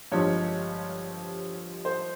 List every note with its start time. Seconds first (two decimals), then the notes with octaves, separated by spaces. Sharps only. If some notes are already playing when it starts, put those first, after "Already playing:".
0.12 G1 G2 F3 G#3 C#5
1.85 C5